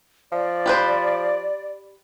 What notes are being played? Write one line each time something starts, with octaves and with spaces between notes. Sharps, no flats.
F3 D5
G4 B4 C5